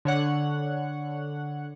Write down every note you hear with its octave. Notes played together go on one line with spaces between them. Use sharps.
D3 C#5 F#5